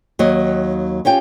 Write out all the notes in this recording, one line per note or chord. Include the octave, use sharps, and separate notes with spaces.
D#2 F#3 D#5
C#4 F4 G4 G5